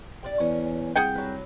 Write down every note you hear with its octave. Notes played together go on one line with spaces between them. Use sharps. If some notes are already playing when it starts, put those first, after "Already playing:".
G4 B4 D5
E2 C#4
C2 G#4 F#5 G5
F#3 B4